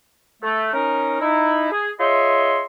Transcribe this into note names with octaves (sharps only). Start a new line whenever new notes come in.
A3
C#4 D#4 A#4
D#4 E4
G#4
F4 G#4 C#5 D#5 E5 C6